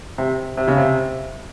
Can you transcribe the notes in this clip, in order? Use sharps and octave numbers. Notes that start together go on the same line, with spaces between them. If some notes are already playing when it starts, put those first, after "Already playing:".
C3
C3
C#3
C3